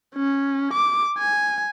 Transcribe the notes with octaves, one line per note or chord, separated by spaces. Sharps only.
C#4
D6
G#5